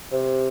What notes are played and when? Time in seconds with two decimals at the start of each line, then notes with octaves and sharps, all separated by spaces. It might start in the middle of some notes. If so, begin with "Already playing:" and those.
0.12 C3